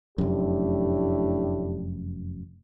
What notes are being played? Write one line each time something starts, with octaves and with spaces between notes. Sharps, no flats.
F1 F#2 A2 D4 G4